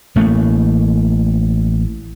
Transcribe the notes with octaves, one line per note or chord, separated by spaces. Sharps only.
A1 A3 A#3